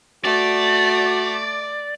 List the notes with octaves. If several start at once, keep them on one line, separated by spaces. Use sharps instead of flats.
A3 F#4 D5